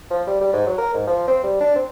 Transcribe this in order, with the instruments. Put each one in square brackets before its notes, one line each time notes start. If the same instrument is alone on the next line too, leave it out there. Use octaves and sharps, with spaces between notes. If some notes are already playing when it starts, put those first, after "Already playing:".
[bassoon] F3
G3
G3
G#2
F#3
A#4
G#2
F3
C4
G3
D4
C4